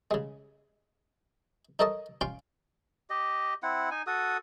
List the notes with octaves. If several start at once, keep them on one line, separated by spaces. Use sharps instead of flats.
C#3 G#3
D#4 A4 A#4 C#5 D#5 A5
C#4 F4 F5 G5 C6
G4 D#5
C4 E4 F#5
D#4 G#5
F#4 A4 D#6